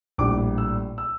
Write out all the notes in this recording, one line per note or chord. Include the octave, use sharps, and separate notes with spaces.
A#1 A2 G3 D6
E6
E6